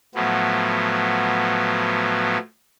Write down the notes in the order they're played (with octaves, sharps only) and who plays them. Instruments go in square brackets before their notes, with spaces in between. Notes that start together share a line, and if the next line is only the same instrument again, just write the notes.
[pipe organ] A2 F3 F#3 B3